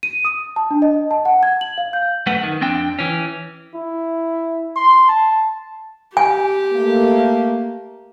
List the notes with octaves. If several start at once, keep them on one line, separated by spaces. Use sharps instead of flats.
D#7
D#6
A5
D4
D#5
A5
F#5
G#6
F#7
F5
G6
F#2 A3 B4 F#5
D#3
F2 C4 D4 G5
E3 C#4
E4
C6
A5
G4 G#5
A3 A#3